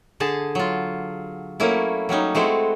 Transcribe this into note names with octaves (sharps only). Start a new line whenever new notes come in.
D3 G#4 A5
F#3 F4
F#3 A3 A#3 C#4 E4
F#3 G3 C#4 D#4
G#3 A3 C4 E4 F#4